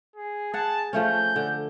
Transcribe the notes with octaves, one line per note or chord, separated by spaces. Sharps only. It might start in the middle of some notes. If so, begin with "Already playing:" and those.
G#4
G#4 F#5 A5
F3 A3 C#4 G6
D3